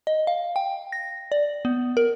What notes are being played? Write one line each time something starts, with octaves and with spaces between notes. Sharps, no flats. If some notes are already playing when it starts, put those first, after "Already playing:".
D#5
F5
G5
A#6
D5
B3
A#4